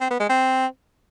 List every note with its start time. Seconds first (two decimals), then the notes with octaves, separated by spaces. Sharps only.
0.01 C4
0.10 B3
0.20 G#3
0.30 C4